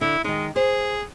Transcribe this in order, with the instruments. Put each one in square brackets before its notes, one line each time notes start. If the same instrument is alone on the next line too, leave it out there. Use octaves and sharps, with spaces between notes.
[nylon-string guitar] D3 [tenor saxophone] E4
[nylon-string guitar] D#3 D#4 [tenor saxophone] G#3
[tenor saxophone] G#4 [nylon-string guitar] C5